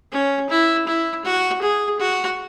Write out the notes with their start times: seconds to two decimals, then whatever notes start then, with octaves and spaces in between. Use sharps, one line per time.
0.12 C#4
0.50 E4
0.87 E4
1.25 F#4
1.62 G#4
2.00 F#4